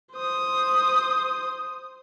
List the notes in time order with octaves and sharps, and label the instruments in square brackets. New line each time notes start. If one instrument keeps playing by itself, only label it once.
[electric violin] C5 D#6